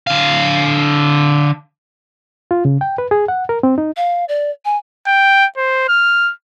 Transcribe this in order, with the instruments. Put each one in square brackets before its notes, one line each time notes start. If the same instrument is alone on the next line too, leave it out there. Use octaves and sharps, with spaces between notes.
[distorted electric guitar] D3 F5
[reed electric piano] F4
C#3
G5
B4
G#4
F#5
A#4
C4
D#4
[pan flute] F5
D5
G#5
[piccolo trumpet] G5
C5
F6